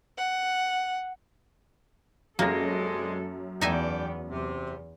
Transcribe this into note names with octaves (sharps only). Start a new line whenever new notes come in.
F#5
F#2 C3 G3 G#3 A#3 C#4 A4 A#6
E2 B3 D#4 A4 D5 E5 G5 G#5
E2 C3